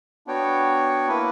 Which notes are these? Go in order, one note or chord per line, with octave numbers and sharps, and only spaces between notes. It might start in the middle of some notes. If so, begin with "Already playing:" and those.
B3 D4 F#4 C#5 G5
A#3 E4 B4